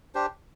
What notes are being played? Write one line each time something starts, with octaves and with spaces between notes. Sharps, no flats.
D4 G4 C5